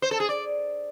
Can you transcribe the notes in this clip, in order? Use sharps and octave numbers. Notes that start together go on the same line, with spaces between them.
C5
A4
G#4
D5